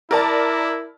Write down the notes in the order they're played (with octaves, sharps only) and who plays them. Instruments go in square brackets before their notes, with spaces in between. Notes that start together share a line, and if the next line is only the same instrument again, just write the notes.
[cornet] E4 [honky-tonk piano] A#4 D5 A5